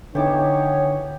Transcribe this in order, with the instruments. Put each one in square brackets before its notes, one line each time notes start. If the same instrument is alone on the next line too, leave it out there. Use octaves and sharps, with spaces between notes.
[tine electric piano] D3 [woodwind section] E3 B3 C#5 [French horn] D#4 [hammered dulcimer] G4 A5 D6